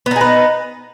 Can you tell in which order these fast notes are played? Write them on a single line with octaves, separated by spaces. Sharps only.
B3 D#4 G#4 B4